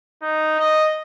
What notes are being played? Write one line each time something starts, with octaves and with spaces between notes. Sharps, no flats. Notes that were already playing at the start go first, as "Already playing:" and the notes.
D#4
D#5